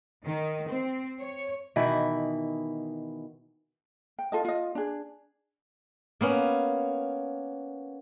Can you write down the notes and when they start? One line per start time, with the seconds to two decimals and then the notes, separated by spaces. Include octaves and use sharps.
0.25 D#3
0.68 C4
1.19 C#5
1.76 B2 D#3 E3 E4
4.19 G5
4.32 F4 A4 D#5
4.45 F4 D#5
4.75 D4 G#4
6.21 A#3 B3 C#4